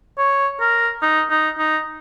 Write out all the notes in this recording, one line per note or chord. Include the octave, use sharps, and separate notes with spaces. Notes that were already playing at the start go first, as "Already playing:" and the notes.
C#5
A#4
D#4
D#4
D#4